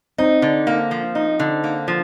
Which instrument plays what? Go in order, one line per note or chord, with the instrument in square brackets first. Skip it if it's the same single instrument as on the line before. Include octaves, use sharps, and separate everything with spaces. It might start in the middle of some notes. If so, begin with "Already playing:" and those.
[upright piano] C4 [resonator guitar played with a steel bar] D#4
[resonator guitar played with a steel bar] D3
A#3
F3
D#4
D3
A#3
F3